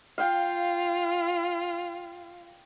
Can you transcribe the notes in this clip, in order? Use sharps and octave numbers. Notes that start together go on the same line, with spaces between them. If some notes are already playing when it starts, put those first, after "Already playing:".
F4 F5 G5